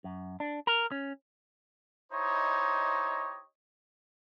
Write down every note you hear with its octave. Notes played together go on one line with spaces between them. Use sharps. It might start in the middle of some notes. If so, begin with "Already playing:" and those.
F#2
D4
A#4
C#4
D#4 E4 G4 C5 C#5 D#5